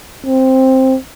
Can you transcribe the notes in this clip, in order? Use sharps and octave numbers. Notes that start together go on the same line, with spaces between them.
C4